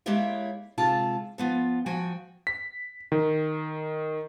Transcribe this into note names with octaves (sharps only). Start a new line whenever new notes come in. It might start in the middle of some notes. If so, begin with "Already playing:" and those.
G#3 A#3 E4 G4 C#5 E5
D2 C3 G#3 F4 A5
F3 B3 F4
F3 F#4 G5 G#5
B6
D#3